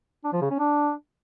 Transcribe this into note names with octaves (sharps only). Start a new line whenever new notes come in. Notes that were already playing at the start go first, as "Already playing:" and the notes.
D4
F3
C#3
C#4
D4